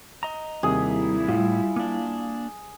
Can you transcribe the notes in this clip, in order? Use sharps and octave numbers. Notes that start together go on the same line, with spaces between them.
D#5 A#5
D#2 C3 G3 E4 G#4
A2 F4
A#3 D4